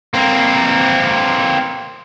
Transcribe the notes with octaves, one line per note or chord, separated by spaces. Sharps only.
A#3 C4